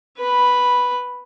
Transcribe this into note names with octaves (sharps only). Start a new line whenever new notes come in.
B4 B5